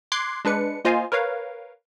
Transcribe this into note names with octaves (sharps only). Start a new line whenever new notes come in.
C6 D6 F#6 G#6 C7
G#3 D4 B4 C#7
A#3 F4 C5 D#5 F5 G#5
A#4 B4 C#5 F5